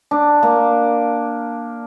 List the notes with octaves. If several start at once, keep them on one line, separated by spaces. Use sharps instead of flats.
D4
A#3